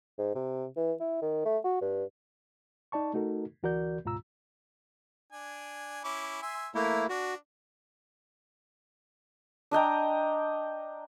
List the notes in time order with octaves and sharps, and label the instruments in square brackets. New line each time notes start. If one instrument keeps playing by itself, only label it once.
[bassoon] G#2
C3
E3
E4
D#3
A3
F#4
G2
[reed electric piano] D#4 D5 A5 C#6
A3 D#4 F#4 A4 A#4
D2 E3 F#4 A#4 D5 G6
D2 G#2 B2 F4 A#5 E6
[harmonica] D4 G#5
C#4 E4 D6
E5 G#5 C6
[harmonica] E3 A#4 [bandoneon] A3 A#3 E4
[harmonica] D4 [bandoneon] F#4
[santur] D4 D#5 G5 A#5